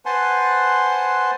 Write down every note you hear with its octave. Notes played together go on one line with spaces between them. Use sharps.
B4 C5 F#5 G#5 A5 C6